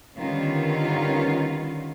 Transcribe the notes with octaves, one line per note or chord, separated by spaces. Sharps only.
D3 D#3 G3 B3 C#4 F4